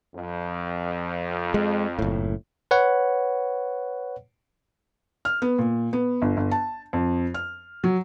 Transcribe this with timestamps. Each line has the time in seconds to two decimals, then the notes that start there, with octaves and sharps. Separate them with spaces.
0.14 F2
1.54 G#3
1.99 F#1 A2
2.71 B4 C#5 F#5
5.25 F6
5.42 B3
5.59 A#2
5.93 B3
6.22 G1
6.37 G1
6.51 A5
6.93 F2
7.34 F6
7.84 F#3